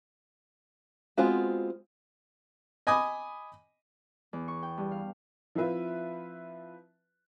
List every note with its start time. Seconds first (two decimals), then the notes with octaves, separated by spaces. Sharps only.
1.17 G#3 B3 C4 F4 F#4
2.87 D#5 G#5 B5 D6 D#6
4.33 E2
4.48 C#6
4.62 G5
4.78 G2
4.91 F5
5.55 F3 C4 E4 F4 B4 E5